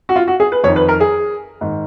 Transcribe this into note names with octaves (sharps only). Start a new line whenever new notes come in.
F#4
F4
F#4
G#4
B4
F2 D#3 C#5
B4
A#4
G#4
G#2 D#3